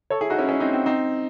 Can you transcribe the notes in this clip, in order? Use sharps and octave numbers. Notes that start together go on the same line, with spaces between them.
A4 C#5
E4 G#4
D#4 F#4
C#4 E4
C#4 E4
C4 D#4
C4
C4 D#4